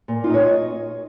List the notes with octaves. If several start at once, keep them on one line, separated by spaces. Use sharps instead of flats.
A#2
D#4 F4
D#5
C#5
D#5